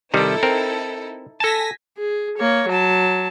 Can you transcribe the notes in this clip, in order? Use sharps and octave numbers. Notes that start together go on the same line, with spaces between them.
C3 D#3 G3 D#4 E4 A4
C4 A#4
A4 G#5 A5 A#6 B6
G#4
A#3 C#5
F#3 A5